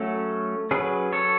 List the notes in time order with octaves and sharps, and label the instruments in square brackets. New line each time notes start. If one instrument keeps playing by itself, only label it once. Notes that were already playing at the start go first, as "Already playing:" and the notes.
Already playing: [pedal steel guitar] F#3 A3 C#4 A4 C#5
F#3 C#4 G#4 B4
A4 C#5